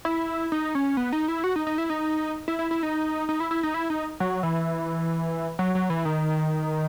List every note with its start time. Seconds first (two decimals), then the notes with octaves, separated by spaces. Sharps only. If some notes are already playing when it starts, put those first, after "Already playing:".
0.05 E4
0.52 D#4
0.75 C#4
0.97 B3
1.13 D#4
1.28 E4
1.44 F#4
1.56 D#4
1.67 D#4
1.78 E4
1.90 D#4
2.48 E4
2.59 E4
2.71 E4
2.83 D#4
3.29 D#4
3.40 E4
3.51 E4
3.63 D#4
3.74 E4
3.90 D#4
4.20 F#3
4.43 E3
5.59 F#3
5.75 F#3
5.90 E3
6.05 D#3